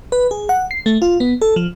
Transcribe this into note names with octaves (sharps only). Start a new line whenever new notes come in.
B4
G#4
F#5
C7
A3
F4
B3
A4
F3